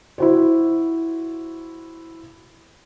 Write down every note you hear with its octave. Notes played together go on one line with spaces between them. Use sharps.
E4 F#4 C5